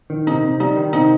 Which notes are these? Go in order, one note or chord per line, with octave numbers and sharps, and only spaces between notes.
D#3
C3 D#4
C3
G3 D#4
D#3
C3 D#4